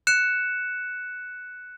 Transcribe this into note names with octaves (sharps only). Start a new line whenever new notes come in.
F#6 C#7 E7